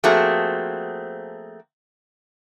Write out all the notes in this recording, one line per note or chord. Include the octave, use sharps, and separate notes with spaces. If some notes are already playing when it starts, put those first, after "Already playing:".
F3 A3 A#3 C4 F#4 G#4